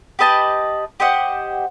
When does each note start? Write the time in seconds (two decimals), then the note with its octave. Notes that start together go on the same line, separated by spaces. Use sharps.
0.19 G4 B4 D#5 A5
1.00 G4 C5 D#5 F#5